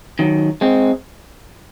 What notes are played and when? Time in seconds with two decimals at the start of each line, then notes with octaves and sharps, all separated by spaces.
0.19 D#3 F#3
0.61 G#3 C4